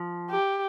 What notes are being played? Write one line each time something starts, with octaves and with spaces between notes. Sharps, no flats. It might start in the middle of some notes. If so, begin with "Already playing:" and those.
Already playing: F3
G4